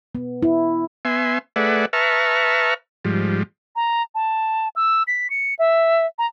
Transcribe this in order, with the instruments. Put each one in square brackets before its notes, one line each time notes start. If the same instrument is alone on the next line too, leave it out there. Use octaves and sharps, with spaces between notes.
[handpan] B3
E4
[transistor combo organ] B3 E5 G#5 C6
A3 G#4 B4 D5 E5 F#5
B4 E5 A5 A#5 C#6 F6
G#2 F3 G3
[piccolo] A#5
A5
E6
B6
C#7
E5
A#5